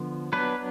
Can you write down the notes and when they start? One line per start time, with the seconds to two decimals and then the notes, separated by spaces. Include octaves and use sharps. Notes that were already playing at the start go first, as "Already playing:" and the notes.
Already playing: D3 F3 B3
0.33 F#3 B3 D4 B4